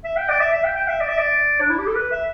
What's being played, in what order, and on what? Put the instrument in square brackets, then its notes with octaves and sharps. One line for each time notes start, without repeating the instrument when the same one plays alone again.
[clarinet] E5
G5
D5
E5
E5
G5
G5
E5
D5
E5
D5
D4
E4
G4
A4
B4
E5